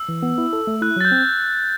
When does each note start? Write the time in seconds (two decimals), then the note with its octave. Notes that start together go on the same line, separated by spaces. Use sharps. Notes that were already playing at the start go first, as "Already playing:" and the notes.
Already playing: E6
0.09 E3
0.23 B3
0.38 E4
0.53 A4
0.67 A3
0.82 E4 F#6
0.97 F#3 A6
1.05 G6
1.12 C4